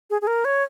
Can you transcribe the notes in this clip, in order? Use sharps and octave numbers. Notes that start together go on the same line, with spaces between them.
G#4
G#4
A#4
C#5